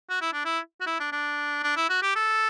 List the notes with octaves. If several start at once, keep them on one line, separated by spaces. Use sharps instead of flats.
F#4
E4
D4
E4
F#4
E4
D4
D4
D4
E4
F#4
G4
A4